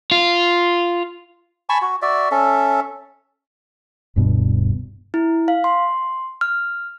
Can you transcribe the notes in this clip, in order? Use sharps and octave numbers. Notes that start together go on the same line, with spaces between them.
F4
G#5 A5 B5 C#6
F#4
F#4 D5 E5
C#4 A4 E5
D1 G2 B2
E4
F5
C6
F6